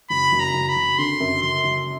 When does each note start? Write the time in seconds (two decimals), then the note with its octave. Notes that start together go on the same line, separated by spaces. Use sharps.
0.10 F#1 B5
0.32 F#1
0.40 A#5
0.54 F#1
0.69 B5
0.76 F#1
0.98 D3 C6
1.20 F#2
1.42 F#1 C6
1.64 F#1